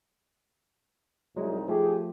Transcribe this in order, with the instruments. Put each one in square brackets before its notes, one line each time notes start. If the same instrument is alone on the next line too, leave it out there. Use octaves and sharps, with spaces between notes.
[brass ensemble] C2 D#4 E4 [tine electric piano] F#3 G#3
[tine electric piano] F3 A3 [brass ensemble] G4 G#4